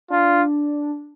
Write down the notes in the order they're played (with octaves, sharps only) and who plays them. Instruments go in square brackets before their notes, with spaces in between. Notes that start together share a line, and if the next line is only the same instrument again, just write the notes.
[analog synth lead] D4 [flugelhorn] F4